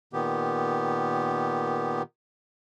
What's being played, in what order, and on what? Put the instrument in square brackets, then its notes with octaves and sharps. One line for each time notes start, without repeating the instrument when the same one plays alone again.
[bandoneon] A#2 D#3 B3 G4